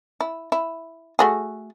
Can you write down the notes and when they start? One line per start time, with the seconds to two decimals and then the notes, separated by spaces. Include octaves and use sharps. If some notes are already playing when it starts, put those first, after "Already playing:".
0.21 E4
0.52 E4
1.19 A3 F#4 G#4